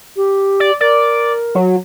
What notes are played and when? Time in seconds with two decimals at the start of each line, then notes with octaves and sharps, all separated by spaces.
0.16 G4
0.60 D5
0.81 A#4 D5
1.55 F#3